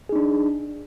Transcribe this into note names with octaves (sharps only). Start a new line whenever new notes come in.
D4 D#4 G#4